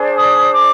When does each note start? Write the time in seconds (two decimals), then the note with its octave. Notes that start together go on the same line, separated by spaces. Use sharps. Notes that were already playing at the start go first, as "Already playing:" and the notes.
Already playing: D4 G#4 C5
0.16 D#6
0.54 D6